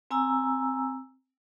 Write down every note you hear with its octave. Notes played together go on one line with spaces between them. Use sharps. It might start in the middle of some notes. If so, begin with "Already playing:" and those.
C4 G#5 A#5 E6